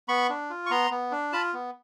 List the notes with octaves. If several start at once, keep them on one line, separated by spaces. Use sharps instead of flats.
B3 B5 C#6
D4
F4
C#6
B3 A#5 C6
B3
D4
F4 A5 B5
B3